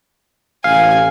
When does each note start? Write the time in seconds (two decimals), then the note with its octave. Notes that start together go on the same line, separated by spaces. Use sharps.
0.64 A1 F5 G#5